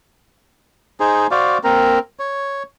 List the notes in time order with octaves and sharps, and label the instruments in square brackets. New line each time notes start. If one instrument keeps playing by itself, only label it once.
[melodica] D#4 G#4 C5
F#4 C5 D5 F5
A#3 C4 A#4
C#5